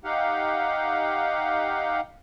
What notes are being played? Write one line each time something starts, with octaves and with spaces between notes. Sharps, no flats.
D#4 G4 F5 F#5